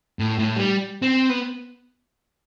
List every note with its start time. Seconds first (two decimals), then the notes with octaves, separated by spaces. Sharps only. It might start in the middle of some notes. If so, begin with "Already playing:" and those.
0.19 A2
0.38 A2
0.56 G3
1.02 C4
1.29 B3